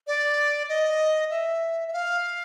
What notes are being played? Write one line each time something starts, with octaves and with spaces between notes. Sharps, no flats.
D5
D#5
E5
E5
F5